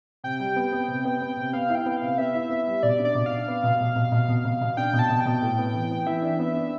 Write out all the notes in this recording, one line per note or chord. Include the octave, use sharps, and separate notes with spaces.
C3 G5
G3
B3
B3
C3
B3
B3
C3
B3 F5
E4
G5
B3
F5
C3
B3 E5
E4
B3
G3
B2 D5
D4
D5
B2
D4 F5
B3
B2
B2
B2
B2
B2
B2
B2
D4 G5
B2
A5
B2
G5
B2
A2
B3
E3
B3
E3 E5
D4
B3
D4